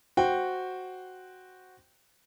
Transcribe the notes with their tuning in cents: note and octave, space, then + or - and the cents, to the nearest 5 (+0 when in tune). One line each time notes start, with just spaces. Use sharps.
F#4 +0 C5 +0 G5 +0